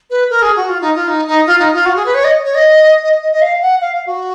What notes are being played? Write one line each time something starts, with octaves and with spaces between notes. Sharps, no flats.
B4
A#4
G#4
F#4
F4
D#4
F4
D#4
D#4
F4
D#4
F4
F#4
G#4
B4
C#5
D#5
C#5
D#5
D#5
D#5
D#5
F5
F#5
F5
F5
F#4